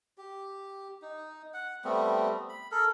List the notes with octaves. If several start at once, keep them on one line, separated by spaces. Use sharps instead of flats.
G4
D#4
F#5
G3 A3 B3 C4
B5
A4 A#4